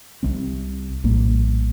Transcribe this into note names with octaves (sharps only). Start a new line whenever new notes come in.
C2 C3 G3 C4
A#1 A2 G3 A#3